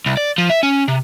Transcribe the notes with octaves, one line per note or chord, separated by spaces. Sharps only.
C2
D5
F3
E5
C#4
C3